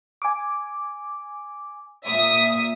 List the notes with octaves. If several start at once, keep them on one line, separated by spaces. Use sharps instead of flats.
G#5 D6
A#2 E5 D#6